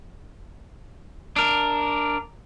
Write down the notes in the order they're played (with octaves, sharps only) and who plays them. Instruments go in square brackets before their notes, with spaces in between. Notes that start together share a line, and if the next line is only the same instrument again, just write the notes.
[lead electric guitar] D4 A#4